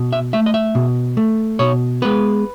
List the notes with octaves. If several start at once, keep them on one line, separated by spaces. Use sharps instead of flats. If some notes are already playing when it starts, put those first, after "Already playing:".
Already playing: B2
E5
A3 E5
D#5
E5
B2
A3
B2 C#5
G#3 B3 B4